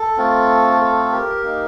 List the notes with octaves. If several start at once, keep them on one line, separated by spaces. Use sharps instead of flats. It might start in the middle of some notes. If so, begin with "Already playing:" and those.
Already playing: A4
A3 C4 F4
A4
G4 A#4
A#3 D#4